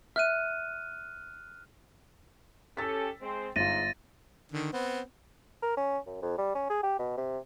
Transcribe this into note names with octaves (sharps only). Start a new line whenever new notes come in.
E5 F6 F#6 D#7
C#4 G4 A4 E6 A6 B6
G#3 C4
G1 G#2 F4 A6 A#6 D#7
D3 D#3
B3 C4
A#4
C#4
F#2
F2
G3
C#4
G#4
G4
B2
C3